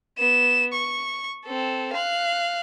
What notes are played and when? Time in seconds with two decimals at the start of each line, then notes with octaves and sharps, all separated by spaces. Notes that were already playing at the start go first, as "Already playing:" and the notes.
0.18 B3 E7
0.73 C#6
1.46 C4 A4
1.93 F5 F#6